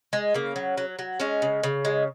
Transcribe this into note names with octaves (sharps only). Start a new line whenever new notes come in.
G#3
C#3 A#3
F#3
F#3
F#3
G#3 C#4
C#3
C#3
G#3